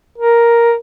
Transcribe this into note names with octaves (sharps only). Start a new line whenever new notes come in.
A#4